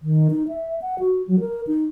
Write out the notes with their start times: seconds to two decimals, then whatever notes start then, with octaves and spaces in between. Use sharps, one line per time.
0.01 D#3
0.30 D#4
0.48 E5
0.82 F#5
0.99 F#4
1.28 F#3
1.40 A#4
1.67 D#4